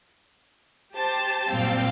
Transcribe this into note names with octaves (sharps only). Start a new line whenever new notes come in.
G4 C5 A5
F#2 A#2 G3 C4 F5 G5